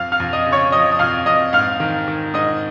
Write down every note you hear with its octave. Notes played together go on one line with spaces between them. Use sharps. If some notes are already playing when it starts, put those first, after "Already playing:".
Already playing: F2 F5 F6
F5 F6
F2
D#5 D#6
C#3
C#5 C#6
F3 D#5 D#6
D#6
F2 F5 F6
F2 D#5 D#6
G#2 F5 F6
D#3
D#3
G#2 D#5 D#6